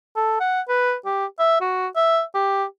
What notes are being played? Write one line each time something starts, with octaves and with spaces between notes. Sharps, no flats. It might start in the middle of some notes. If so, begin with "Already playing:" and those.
A4
F#5
B4
G4
E5
F#4
E5
G4